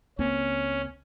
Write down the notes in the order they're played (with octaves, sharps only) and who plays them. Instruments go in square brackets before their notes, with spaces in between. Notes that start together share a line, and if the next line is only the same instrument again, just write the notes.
[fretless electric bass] C#2 A#3 C4 [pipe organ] C#4